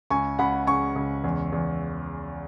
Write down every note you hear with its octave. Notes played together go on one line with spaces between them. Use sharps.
C#2 G#5 C#6
C#2 F#5 B5
C#3 G#5 C#6
C#2
E2
E2